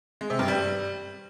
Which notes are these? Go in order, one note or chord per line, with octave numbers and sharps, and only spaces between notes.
G#3
C3
G2
G3